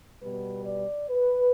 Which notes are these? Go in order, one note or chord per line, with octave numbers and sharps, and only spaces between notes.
B2 G3 B3 B4
D5
B4